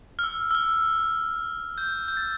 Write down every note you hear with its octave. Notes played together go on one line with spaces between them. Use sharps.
F6
E6
E6
F6
G6
G6
A6